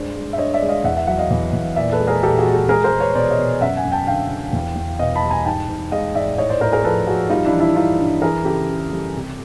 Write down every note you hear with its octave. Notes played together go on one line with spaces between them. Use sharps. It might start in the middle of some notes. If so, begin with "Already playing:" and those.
Already playing: G2 G#3 C5 D5
G#3
E5
G2 C#5 D#5
D5 E5
G#3
D#5 F5
E2 E5 F#5
E5 F#5
F#3 E5 F#5
D#5 F5
E2
E2
A#2 D5 E5
A4 B4
G#3
G#4 A#4
A#2 G4 A4
F#4 G#4
G#3
G4 A4
G#3 G#4 A#4
A#4 C5
G#3
B4 C#5
B2 C5 D5
C#5 D#5
B2
F#2 E5 F#5
F#5 G#5
F#2
G5 A5
D3 F5 G5
D3
E2
E2
B2 D#5 F5
A5 B5
G3
G#5 A#5
G#2 G5 A5
G#2
G#3 D#5 F5
G#2 D5 E5
A2 C#5 D#5
C5 D5
A2 A#4 C5
G#4 A#4
F3 A4 B4
F3 F#4 G#4
G3 D#4 F4
D4 E4
E3
D4 E4
G2 D#4 F4
G2
E3 G#4 A#4
C#3 G4 A4
C#3
G3
C3